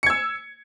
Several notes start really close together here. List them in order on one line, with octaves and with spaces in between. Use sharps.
C#7 G#6 E6